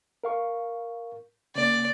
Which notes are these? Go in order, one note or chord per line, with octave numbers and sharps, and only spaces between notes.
A#4 F5 C#6
C#3 A#3 D5